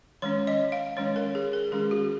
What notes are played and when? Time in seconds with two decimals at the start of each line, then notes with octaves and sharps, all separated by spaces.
0.22 D#3 G#3 C#4 C#5
0.47 D#5
0.72 F5
0.97 D#3 G#3 C#4 C#5
1.16 A#4
1.35 G#4
1.53 A#4
1.72 D#3 G#3 C#4 G#4
1.91 F#4